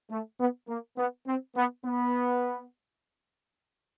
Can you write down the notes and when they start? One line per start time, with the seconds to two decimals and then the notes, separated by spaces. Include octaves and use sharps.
0.10 A3
0.40 B3
0.69 A#3
0.98 B3
1.27 C4
1.56 B3
1.85 B3